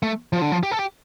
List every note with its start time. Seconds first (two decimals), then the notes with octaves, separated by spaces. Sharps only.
0.03 A3
0.33 F3
0.41 D3
0.52 F3
0.63 G4
0.71 A4
0.79 G4